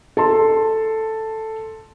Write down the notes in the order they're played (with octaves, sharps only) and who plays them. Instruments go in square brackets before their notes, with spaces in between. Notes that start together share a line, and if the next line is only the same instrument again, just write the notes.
[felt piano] A4 A5 C6